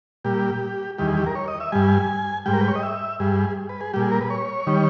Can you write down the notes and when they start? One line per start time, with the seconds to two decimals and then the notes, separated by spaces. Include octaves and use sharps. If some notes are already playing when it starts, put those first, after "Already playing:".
0.25 A#2 G3 G4
0.98 E2 D#3 G3 G4
1.07 G#4
1.17 G4
1.26 A#4
1.35 C#5
1.48 D#5
1.60 E5
1.72 G2 G3 G#5
2.46 G#2 G3 G5
2.53 A#4
2.61 B4
2.68 C#5
2.75 D#5
2.83 E5
3.20 G2 G3 G#4
3.69 B4
3.81 G#4
3.94 A#2 G3 G4
4.02 G#4
4.12 A#4
4.21 B4
4.30 C#5
4.67 D#3 G3